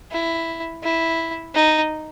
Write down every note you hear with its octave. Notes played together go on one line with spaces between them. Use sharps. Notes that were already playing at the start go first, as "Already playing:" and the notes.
E4
E4
D#4